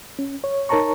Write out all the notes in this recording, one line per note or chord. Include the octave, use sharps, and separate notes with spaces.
C#4
C#5
D#4 A#4 C#5 A5 A#5 C#6